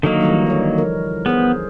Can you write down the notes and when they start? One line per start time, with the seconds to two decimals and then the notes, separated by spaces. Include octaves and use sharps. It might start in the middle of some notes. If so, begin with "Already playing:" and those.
0.03 D3 D#3 F#3 A#3 D#5
0.21 E3 G3 D#4
0.46 D#4 C#5
0.78 F3 A#4
1.26 B3 G#4 C5